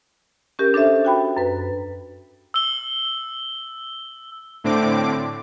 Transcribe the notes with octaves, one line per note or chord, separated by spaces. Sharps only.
C#4 G4 A#4
D4 A4 C5 E5
F#4 G5 B5
F#2 B4
E6 G7
A2 D3 C4 D6